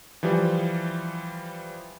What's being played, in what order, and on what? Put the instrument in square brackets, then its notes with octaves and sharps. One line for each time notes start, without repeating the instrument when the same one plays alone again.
[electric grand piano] E3 F3 G3